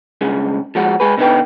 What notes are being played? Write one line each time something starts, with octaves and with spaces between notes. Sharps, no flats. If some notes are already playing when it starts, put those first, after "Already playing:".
G2 C#3 G#3
F3 G#3 F#4
G#3 G#4 B4
B2 D3 D#4 B4 G5